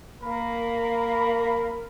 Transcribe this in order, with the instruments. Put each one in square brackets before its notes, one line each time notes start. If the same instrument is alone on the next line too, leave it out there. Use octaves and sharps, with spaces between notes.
[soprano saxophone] A#3 [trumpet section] A#4 B5